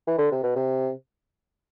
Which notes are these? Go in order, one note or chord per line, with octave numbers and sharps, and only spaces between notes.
E3
D3
C3
B2
C3